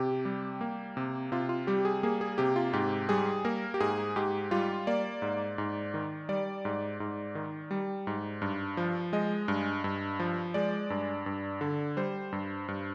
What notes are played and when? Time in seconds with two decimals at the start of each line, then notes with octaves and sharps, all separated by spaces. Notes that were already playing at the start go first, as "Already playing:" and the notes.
Already playing: C3 G4
0.25 G3
0.61 A#3
0.97 C3
1.32 C3 F4
1.49 F4
1.67 G3 G4
1.85 G#4
2.03 A#3 G#4
2.21 G#4
2.38 C3 G4
2.56 F4
2.73 G#2 G4
3.09 G3 G#4
3.45 A#3 A#4
3.74 G4
3.80 G#2 G#4
4.16 G#2 G4
4.51 G3 F4
4.87 A#3 D5
5.22 G#2
5.58 G#2
5.94 D#3
6.29 G3 D5
6.65 G#2
7.00 G#2
7.35 D#3
7.71 G3
8.07 G#2
8.42 G2
8.77 F3
9.13 G#3 D#5
9.48 G2
9.84 G2
10.19 F3
10.54 G#3 D5
10.90 G2
11.26 G2
11.61 D3
11.97 G3 C5
12.32 G2
12.68 G2